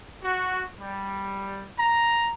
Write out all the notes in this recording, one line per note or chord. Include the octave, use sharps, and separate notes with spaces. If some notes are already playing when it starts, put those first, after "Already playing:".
F#4
G3
A#5